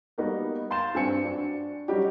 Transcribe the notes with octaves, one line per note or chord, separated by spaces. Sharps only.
G3 A#3 B3 D#4 F#4 A#4
F5 C6 G6 A6 E7
G2 C4 G#5 C#7
D4 F#4
F#3 G3 C#4 D#4 F#4 G4